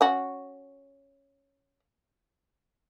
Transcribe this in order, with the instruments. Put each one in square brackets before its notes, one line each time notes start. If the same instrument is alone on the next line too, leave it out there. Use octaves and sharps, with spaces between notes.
[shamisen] C#4 F#4